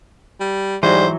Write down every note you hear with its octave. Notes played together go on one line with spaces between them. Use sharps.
G3
G#2 E3 F#3 G3 C5